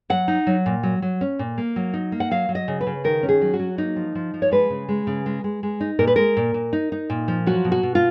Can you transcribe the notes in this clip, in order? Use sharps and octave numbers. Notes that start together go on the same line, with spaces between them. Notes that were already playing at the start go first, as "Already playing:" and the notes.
F#3 F#5
D#4
F#3
A#2
F#3
F#3
C#4
A#2
A#3
F#3
D#4
A#3
F#5
F#3 F5
F#3
D#5
C#3
B4
C#3
D#3 A#4
C#4
G#4
F#3
F#4
F#3
A#3 D#4
F3
F3
F3
C#5
G#3 B4
C#3
G#3
C#3
G#3
G#3
G#3
D#4
A#2 A#4
B4
G#3 A#4
A#2
A#2
D#4
D#4
A#2
F3
F#3 F#4
B2
F#4
B2
F4